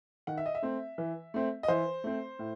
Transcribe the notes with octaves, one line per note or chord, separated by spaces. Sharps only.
D#3 F#5
E5
D#5
E5
A3 C4
E3
A3 C4
D#5
E3 C5
A3 C4
A2